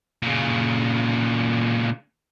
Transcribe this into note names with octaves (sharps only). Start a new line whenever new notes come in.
A#2 C#3